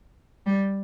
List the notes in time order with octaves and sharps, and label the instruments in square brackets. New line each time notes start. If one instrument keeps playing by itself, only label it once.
[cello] G3